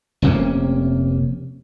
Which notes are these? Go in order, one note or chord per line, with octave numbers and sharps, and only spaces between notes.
F1 C3 A#3 C#4